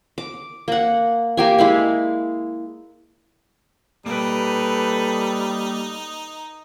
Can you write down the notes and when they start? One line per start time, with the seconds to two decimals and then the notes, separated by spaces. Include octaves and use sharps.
0.18 D6
0.68 A#3 F#5
1.37 A#3 G4 G#5
1.59 G#3 E4 F5
4.06 G3 A#3 D#4 A4 B4 D5